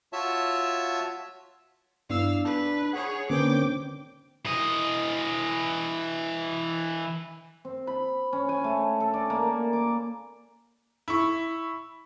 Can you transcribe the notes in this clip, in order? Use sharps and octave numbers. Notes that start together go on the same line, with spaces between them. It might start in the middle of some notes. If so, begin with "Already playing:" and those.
F4 F#4 C#5 E5 A5
G2 B3 D4 E4 F5 E6
B4 A5
G#4 C#5 F#5
D3 A#3 C4 C#4 A#4 B4 G5 D6
E3 D#5
C4
B5
C#4
G#5
A3
A4
D5
A#3
D6
E4 C#6